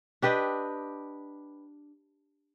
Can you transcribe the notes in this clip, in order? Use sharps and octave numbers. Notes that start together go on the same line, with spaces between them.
D4 G4 B4 D#5